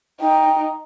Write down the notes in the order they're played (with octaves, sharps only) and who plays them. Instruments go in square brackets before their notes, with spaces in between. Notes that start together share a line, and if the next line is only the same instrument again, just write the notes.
[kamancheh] D#4 [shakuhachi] G5